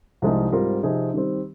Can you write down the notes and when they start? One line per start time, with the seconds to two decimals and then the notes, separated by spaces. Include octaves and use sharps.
0.22 C2 C3 F3 G#3 D#4
0.52 G#2 G3 C4 F4 A#4
0.83 C3 F3 C4 D#4 G#4
1.14 D#3 G3 C4